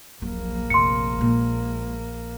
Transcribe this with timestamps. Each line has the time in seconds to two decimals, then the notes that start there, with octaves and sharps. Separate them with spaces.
0.22 D#1 A#1 F#3 A#3
0.70 F1 C6 C#7
1.18 A#2 G#3